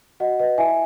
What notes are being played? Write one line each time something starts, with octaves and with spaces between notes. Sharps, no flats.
F#4 D#5 F#5
B4 D#5
E4 E5 G#5